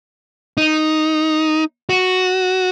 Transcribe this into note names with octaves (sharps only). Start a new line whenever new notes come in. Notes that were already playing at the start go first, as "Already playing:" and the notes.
D#4
F#4